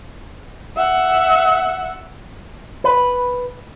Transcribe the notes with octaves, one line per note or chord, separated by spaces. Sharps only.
E5 F#5
B4